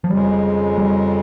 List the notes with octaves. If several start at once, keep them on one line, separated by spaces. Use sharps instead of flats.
F3
F2 C#3 G3 G#3
G3